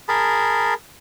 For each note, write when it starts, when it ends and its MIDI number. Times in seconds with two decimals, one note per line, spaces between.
0.09 0.74 68
0.09 0.74 70
0.09 0.74 81
0.09 0.74 83